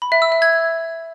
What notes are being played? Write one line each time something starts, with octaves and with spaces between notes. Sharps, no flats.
B5
E5
E6
E5
G#6